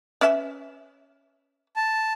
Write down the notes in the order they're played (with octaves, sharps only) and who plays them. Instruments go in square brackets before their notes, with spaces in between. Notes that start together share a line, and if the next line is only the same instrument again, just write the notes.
[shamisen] C#4 B4 E5
[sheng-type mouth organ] A5